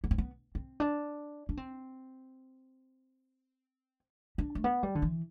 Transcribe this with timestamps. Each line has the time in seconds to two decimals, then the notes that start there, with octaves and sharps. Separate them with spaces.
0.04 B3
0.11 C4
0.18 B3
0.55 C4
0.80 D4
1.49 D4
1.57 C4
4.38 D4
4.55 A3
4.64 B3
4.83 G3
4.95 D3
5.02 E3